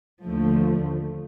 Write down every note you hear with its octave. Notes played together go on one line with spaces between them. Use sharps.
D#2 D3 F3 A3